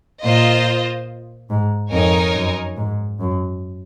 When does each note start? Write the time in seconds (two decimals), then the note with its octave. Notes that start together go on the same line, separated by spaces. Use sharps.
0.23 A#2 F4 C5 D#5
1.50 G#2
1.92 F2 D#4 A#4 C#5 G#5
2.35 F#2
2.77 G#2
3.20 F#2